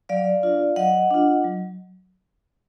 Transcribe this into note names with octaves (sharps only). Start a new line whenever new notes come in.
F#3 D5 F5
D4 F4
F#3 D#5 F#5
D4 F4
F#3